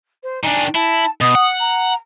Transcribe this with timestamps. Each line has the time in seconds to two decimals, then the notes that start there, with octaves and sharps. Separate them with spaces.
0.23 C5
0.44 D#3 D4 G#5
0.75 E4 A5
1.21 B2 D#6
1.35 F#5
1.60 A#5